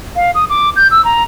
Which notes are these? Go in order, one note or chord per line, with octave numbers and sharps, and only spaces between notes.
F5
D#6
D6
G6
E6
A#5